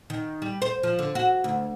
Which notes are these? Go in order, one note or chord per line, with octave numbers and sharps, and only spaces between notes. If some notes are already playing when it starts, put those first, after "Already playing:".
D#3
G3
C5
F3
D3
F#4
D2